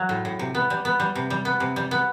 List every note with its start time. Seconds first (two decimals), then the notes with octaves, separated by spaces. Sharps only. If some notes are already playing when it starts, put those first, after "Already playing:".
Already playing: F#3
0.09 A2
0.25 A2
0.39 C3
0.55 B3
0.70 G3
0.85 B3
1.00 G3
1.15 C3
1.30 G3
1.45 B3
1.60 C3
1.76 G3
1.91 B3